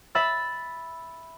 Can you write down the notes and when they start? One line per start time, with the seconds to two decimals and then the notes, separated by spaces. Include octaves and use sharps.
0.15 E5 B5 E6 A6